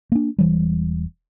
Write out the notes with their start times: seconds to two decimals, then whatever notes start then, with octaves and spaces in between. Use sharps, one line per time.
0.12 A#3 D4
0.38 E1 E3 G3